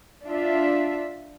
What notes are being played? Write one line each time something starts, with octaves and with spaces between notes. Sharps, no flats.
D4 F4 E5